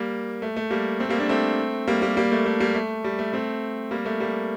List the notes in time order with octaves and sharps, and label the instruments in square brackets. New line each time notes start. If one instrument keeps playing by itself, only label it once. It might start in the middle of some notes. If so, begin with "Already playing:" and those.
Already playing: [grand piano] G3 A#3
A3
A3
G3 A#3
A3 C4
G3 A#3
A#3 D4
A3 C4
G3 A#3
G3 A#3
G3 A#3
A3
A3
G3 A#3
A3
G3
A3
A3 C4
G3 A#3
A3
G3 A#3